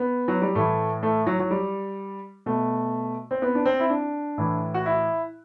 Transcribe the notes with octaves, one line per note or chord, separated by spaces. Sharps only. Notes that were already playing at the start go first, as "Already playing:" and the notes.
Already playing: B3
F#3
G3
A2 E3 A3
A3
F#3
F#3
G3
B2 A3
C4
B3
D4
C4
E4
D4
A2 E3
F#4
E4